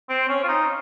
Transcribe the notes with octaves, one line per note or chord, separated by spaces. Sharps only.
C4
C#4
F4
D#4